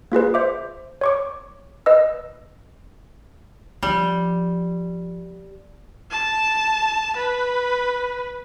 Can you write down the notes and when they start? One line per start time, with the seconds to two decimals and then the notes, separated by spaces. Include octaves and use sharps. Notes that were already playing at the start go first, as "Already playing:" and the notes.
0.12 A#3 F4 G#4 B4
0.34 C5 E5 D6
1.01 C#5 C#6 D6
1.86 B4 D#5 E6
3.83 F3 G3
6.11 A5
7.17 B4